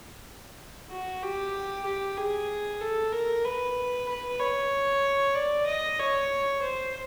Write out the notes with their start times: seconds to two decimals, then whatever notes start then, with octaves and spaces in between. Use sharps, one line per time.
0.91 F#4
1.22 G4
1.85 G4
2.17 G#4
2.81 A4
3.12 A#4
3.45 B4
4.09 B4
4.40 C#5
5.35 D5
5.66 D#5
5.99 C#5
6.62 C5